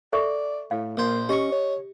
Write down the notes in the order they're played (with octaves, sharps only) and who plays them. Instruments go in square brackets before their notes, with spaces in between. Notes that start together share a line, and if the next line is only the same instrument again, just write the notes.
[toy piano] A4 E5 C#6 [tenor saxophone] D5
[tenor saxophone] A2 [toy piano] F5
[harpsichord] A#1 C5 [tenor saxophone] A#3
[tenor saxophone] C#4 [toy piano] G4 [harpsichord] D#5 C#6
[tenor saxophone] C#5